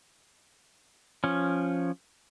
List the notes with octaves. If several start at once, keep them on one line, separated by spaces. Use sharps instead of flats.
F3 C#4